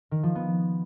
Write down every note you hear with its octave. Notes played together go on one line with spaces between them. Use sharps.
D#3
F3
B3